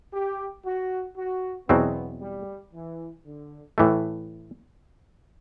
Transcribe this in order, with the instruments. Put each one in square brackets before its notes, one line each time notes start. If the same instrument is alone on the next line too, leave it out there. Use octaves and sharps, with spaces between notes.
[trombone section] G4
F#4
F#4
[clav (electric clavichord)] E2 B2 F#3 C4 [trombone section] B3
[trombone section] G3
E3
D3
[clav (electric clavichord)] A2 E3 A3